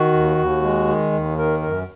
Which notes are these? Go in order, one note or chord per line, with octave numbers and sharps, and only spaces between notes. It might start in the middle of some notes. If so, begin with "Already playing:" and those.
Already playing: D#3 F#4
D#2
D#2
G#3
D#3
D#2
D#3 A#4
F#2 A#4